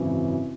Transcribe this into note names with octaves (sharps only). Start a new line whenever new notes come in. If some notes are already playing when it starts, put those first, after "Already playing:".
Already playing: G#1 F#2 C#3 E3